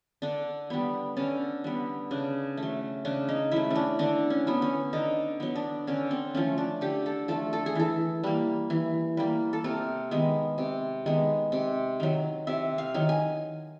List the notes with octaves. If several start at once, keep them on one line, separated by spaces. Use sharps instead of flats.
D3 D4
G3 B3
D3 C#4
G3 B3
C#3 D4
A3
F#3
C#3 D4
D#4
F#3 A3 E4
C#4
D4
D3 D4
C#4
F#3 B3
C#4
D3 D#4
F#3 B3
D4
D3 C#4
C4
F3 A3 C#4
D4
D3 G4
A4
F3 A3 A4
A4
G#4
E3 A4
G3 A#3
E3
G3 A#3
A4
C3 A#4
D#3 G#3 B3
C3
D#3 G#3 B3
C3
D#3 F#3
C3 E5
F5
D#3 F#3
G#5